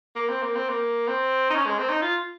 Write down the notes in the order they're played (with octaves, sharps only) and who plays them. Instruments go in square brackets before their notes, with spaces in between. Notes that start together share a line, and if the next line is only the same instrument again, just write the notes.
[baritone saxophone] A#3
C4
A#3
C4
A#3
C4
D#4
C#4
G#3
C4
D#4
F4